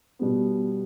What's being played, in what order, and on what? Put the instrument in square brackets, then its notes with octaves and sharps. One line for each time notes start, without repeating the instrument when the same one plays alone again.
[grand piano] B2 G3 B3